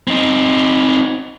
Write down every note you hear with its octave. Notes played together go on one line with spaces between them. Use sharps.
C4 D#4